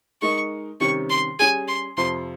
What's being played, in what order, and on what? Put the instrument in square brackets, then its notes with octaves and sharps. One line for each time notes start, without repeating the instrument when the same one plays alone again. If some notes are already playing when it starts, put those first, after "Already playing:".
[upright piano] G#3 D#4 A#4 D#5 [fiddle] C#6
[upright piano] C3 D#3 G3 C#4 G4 [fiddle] C#6
[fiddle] C6
[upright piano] G3 C#4 G#4 [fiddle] G#5
[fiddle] C6
[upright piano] F2 C3 F3 [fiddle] C6